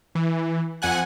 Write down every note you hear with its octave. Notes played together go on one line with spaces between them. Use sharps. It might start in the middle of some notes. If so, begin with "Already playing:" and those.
E3
F2 F#5 G#5 F#6